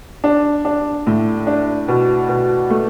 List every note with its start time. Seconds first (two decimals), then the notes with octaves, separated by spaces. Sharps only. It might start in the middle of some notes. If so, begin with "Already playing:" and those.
0.24 D4
0.65 D4
1.07 A2
1.47 D4
1.88 B2
2.29 B2
2.70 A3